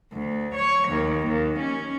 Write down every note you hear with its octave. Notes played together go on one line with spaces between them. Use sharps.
D2
C#5
D#2
D#2
C#4